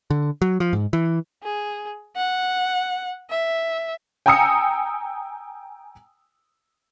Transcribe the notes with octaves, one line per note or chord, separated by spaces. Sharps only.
D3
F#3
F3
G#2
E3
G#4
F#5
E5
G5 G#5 A#5 D#6 E6 C#7